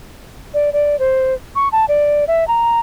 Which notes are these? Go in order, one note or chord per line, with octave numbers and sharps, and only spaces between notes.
D5
D5
C5
C#6
A5
D5
E5
A#5